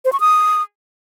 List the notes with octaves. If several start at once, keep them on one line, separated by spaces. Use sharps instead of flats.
C5
C#6
D#6